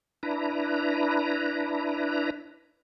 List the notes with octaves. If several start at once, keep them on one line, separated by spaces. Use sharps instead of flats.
D4 E4 B4 A#5